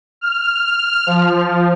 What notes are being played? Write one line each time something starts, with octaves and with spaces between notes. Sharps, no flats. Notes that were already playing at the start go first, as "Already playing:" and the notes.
F6
F3